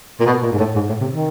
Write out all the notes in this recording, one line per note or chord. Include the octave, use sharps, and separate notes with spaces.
A#2
B2
A#2
G#2
A2
G#2
A2
C3
D#3